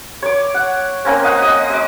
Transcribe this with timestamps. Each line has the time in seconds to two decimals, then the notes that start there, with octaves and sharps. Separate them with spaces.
0.23 C#5 D6
0.54 F#5
1.05 A#3 C4 C#4
1.24 D#5 F5 F#5
1.42 D#5 D#6
1.70 D#5 D6